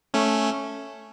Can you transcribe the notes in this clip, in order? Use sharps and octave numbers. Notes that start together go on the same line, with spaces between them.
A3 C#4